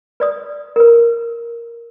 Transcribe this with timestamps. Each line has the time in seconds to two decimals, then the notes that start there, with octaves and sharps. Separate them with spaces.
0.20 B4 D5 D#6
0.76 A#4 B4